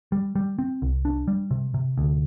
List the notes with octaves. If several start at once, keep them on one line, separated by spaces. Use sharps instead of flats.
G3
G3
C4
C2
D4
G3
C3
C3
D2